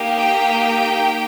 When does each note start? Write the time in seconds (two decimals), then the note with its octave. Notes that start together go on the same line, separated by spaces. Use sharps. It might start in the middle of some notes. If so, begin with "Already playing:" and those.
Already playing: A#3 D#4 G4
0.19 G5